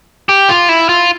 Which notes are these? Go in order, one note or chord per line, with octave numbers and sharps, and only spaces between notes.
G4
F4
E4
F4